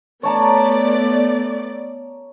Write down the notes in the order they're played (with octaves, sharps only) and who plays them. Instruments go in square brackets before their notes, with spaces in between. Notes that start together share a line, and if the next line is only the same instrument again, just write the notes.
[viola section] A3 B3 D5 [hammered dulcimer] C#5 A5 A#5